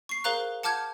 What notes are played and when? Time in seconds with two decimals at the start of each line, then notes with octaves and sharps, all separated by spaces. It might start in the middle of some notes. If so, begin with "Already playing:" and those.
0.09 C#6 C7
0.24 G#4 A#4 C5 F5 A#5 F#6
0.63 F#5 A5 D6 F6 G6 G#6